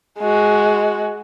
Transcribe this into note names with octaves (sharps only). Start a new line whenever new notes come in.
G#3 F#4